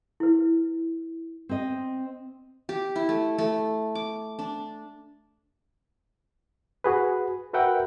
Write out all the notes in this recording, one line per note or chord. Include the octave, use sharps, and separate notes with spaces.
E4 B4
C4 D#5
G4
E4
A3
A3
D6
D4
F#4 G#4 B4
F#4 A#4 B4 E5 F#5 G5